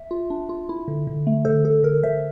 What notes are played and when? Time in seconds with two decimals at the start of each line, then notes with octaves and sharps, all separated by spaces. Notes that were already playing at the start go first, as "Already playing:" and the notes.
Already playing: E5
0.11 F4
0.30 D4
0.49 F4
0.69 E4
0.88 D3
1.07 D3
1.27 A3
1.45 D3 A4 C5
1.65 D3 A4
1.83 D3 A#4
2.03 D3 C5 E5